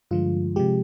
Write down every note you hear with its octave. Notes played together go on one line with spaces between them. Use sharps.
G2 D3 F3 G#3 F4
C3 F3 G#3 G4